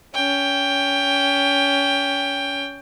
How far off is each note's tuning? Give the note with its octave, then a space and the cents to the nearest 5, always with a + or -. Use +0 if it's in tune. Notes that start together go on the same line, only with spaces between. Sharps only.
C#4 +25 G5 +10